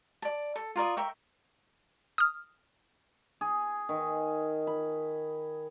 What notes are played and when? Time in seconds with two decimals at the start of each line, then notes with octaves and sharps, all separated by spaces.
0.22 D5 A5
0.56 A4
0.76 F4 A#4 D5 D#6
0.97 A#4 E5 G5 C#6
2.18 D#6 F6
3.41 G#4
3.89 D#3
4.67 B5